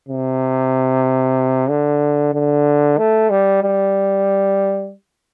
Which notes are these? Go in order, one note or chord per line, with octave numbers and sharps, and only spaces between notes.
C3
D3
D3
A3
G3
G3